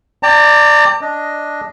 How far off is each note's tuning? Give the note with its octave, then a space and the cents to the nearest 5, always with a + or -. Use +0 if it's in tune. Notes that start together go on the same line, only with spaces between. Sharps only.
D5 +5 G5 +25 A#5 -40
D4 +0 D#5 +0